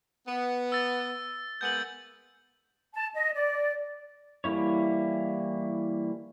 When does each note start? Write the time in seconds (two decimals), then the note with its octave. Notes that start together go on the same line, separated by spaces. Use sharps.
0.27 B3
0.72 E6 A6
1.61 G#3 A#3 B3 G6 F#7
2.93 A5
3.14 D#5
3.34 D5
4.44 E3 G3 A#3 E4 C#5